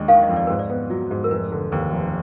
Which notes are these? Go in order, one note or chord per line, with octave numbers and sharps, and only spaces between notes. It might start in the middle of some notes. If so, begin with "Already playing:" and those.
Already playing: D#2 G#3 D4
D#3 F5
D#5
F2
D5
G#2 B4
D5
B3
F#3
G#2
A#4
F1 B4
D3
D#2 B4
F1